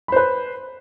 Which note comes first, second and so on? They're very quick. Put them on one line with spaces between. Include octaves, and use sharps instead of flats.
B5 C5 B4